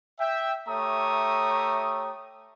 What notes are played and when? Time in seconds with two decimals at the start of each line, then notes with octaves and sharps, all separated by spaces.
0.20 E5 G5
0.68 A3 G4 C#5 E5 A#5 D#6